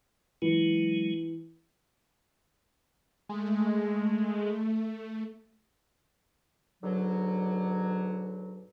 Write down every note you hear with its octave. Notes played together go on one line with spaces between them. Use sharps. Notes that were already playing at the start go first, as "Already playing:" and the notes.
E3 F#3 G#3
G#3 A3
G#2 B2 D3 F#3